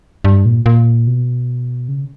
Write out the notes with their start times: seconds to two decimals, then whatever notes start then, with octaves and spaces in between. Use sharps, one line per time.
0.24 G2
0.45 A#2
0.66 A#2
1.07 B2
1.89 C#3